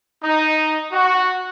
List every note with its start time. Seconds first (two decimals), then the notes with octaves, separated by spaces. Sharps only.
0.24 D#4
0.92 F#4